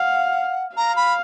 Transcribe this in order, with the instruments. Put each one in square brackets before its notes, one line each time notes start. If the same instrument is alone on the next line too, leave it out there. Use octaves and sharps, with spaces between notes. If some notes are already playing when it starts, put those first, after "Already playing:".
Already playing: [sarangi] F5 [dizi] F#5
[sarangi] F5 [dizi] A#5
[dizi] B5